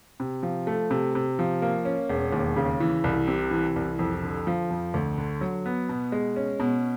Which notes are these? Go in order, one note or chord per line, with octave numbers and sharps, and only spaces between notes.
C3
F3
A3
C3
C3
F3
A#3
C#4
E1
D#2
C#3
E3
C2
C3
E3
C2
F2
D3
F3
F2
D2
D3
F#3
B3
B2
G#3
C#4
B2